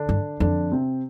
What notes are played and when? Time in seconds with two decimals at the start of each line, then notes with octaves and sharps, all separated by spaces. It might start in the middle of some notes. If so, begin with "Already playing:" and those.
Already playing: D3 D4
0.09 G2
0.40 F2 D3 D4
0.72 C3 C4